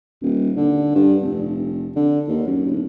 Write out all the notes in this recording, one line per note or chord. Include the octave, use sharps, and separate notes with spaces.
D#1
D3
G2
F1
D3
D#2
F#2
D1